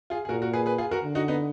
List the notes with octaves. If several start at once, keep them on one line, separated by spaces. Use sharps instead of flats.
F4 G#4
G#4
A#2 F#4 A#4
F#4 A#4
G#4 B4
G#4 B4
F4 G#4
F#4 A#4
D3
D#4 F#4
B3 D#4